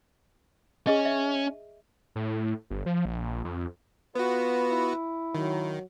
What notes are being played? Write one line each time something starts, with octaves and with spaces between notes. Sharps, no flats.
C#4 G#4 D#5
E5
A2
G1
F3
A#1
F2
B3 F4 F#4 B4
E4
D#3 F#3